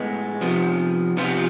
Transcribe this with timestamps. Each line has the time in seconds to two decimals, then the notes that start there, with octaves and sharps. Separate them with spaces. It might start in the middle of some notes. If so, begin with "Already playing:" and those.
Already playing: A2 G#3 B3
0.41 C3 F3 B3
1.17 C3 F3 B3 F4